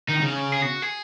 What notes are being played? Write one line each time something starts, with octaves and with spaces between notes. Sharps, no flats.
D#3 D#4
C#3
G#4
F#4
G#4